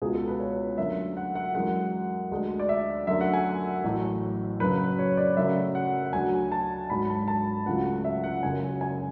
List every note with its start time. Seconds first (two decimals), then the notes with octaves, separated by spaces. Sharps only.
0.02 C#2 B2 G#3 G#4
0.14 A4
0.28 B4
0.40 C#5
0.78 F#2 D3 A3 E5
1.17 F#5
1.35 F#5
1.55 F#2 E3 G#3 F#5
2.32 D2 D3 G#3
2.59 D5
2.69 E5
3.07 F#2 D3 A3 E5
3.21 F#5
3.34 G#5
3.84 A1 A2 F#3 A3
4.60 F#1 F#2 C#3 F#3 B4
4.99 C#5
5.17 D5
5.37 F#2 C#3 F#3 A3 E5
5.75 F#5
6.06 F#5
6.13 D2 D3 F#3 G#5
6.52 A5
6.90 G#1 G#2 F#3 B5
7.10 A5
7.28 A5
7.66 C#2 C#3 F#3 A3 F#5
8.05 E5
8.24 F#5
8.43 F#1 F#2 C#3 G#5
8.81 G#5